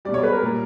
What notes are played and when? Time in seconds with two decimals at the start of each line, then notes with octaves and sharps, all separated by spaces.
0.05 B2 G3 D5
0.14 C#5
0.23 B4
0.33 A#4
0.42 A#2 G3